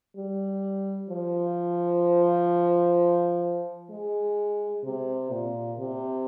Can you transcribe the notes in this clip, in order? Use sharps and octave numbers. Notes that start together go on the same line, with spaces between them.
G3
F3
G#3
C3
A#2
C3